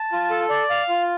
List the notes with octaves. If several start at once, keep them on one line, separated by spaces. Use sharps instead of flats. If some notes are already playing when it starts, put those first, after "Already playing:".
Already playing: A5
F4
A4
D5
F5
F4